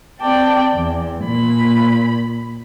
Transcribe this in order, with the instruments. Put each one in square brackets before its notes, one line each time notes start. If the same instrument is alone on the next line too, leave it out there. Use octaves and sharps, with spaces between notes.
[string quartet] C4 D5 G5 A5
E2
A#2 B5